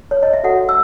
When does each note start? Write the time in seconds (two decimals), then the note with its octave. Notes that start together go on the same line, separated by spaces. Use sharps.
0.11 C#5
0.23 D#5
0.33 E5
0.44 F#4 A4 C#5 F#5
0.69 E6